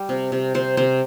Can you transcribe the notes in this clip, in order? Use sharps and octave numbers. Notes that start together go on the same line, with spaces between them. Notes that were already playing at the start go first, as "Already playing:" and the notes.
Already playing: G3 G5
C3
C3
C3 C5
C3 C5